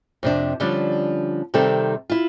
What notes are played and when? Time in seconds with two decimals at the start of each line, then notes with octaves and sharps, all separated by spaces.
0.23 F2 C3 D4
0.60 D3 F3 G3 C#4 D4
1.54 C3 D#3 G3 C4 A4
2.10 E4 F4